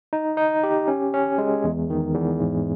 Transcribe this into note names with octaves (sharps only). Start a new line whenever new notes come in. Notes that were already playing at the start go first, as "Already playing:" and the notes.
D#4
D#4
G4
C#4
C#4
G#3
E2
D#3
E2
G#2